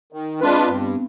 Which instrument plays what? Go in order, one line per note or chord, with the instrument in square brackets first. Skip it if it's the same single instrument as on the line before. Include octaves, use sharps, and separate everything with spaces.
[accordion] D#3
[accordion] G#3 D4 F4 B4 [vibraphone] C4
[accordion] G2 [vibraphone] B3